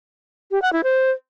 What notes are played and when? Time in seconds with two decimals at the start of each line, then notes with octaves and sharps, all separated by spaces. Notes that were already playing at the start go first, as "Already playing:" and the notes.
0.51 G4
0.62 F#5
0.73 E4
0.84 C5